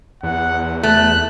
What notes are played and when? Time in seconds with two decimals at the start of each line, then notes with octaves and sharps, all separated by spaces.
0.23 E2 F#5
0.83 A3 F#6